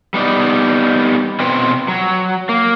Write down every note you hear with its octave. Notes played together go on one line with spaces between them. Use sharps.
G3 B3 D#4 D5
B2 C4 F4 B4 G5
F#3
A#3